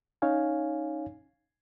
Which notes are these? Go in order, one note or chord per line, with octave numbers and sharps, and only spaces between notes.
C#4 D#4 C#5 F5 G#5